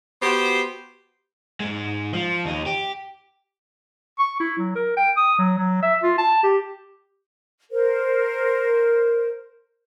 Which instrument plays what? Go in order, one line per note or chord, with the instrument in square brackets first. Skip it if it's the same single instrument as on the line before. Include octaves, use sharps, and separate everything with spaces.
[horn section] B3 F#4 G4 C5
[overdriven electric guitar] G#2 G#3
F3
D#2 D#4
G4
[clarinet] C#6
E4
F#3
A#4
G5
D#6
F#3
F#3
E5
F4
A5
G4
[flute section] A#4 C5